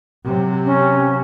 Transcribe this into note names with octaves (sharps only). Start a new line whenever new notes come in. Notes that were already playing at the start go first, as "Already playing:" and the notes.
C3 F#3
C#4